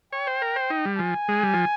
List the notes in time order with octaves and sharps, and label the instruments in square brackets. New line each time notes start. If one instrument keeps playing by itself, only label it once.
[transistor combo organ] C#5 [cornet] G5
[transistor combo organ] C5
A#4
C5
D#4
G3
[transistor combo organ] F3 [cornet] G#5
[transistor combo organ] G#3
G3
F3